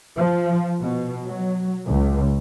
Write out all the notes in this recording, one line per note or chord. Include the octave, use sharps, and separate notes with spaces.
F3
B2
F#3
C#2